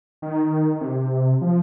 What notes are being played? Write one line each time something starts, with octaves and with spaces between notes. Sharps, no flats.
D#3
D#3
C3
F3